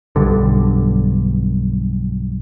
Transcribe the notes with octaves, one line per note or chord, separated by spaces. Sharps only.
B1 G2 D3